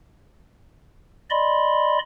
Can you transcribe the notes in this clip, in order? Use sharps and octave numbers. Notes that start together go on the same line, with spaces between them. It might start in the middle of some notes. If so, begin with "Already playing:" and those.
D5 D#5 B5 C6